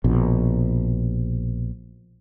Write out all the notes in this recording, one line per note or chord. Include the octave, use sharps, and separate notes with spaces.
A#1 B2